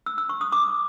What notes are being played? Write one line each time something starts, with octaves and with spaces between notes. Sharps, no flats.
E6
E6
C#6
D#6
D6